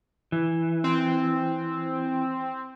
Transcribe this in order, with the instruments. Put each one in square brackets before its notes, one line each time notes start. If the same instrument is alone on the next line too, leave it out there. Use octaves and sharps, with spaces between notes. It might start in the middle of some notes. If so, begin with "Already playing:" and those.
[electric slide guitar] E3
[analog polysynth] C4